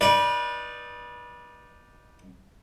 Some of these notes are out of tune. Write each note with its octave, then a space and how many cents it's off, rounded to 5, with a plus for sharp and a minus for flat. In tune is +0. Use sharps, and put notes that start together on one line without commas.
D#4 +0 B4 -30 D5 +5